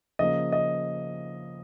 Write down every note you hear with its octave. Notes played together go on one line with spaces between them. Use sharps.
C#3 F3 A#3 D#5
D#5